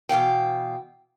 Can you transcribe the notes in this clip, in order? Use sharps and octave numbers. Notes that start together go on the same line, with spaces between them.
B2 E3 F5 G5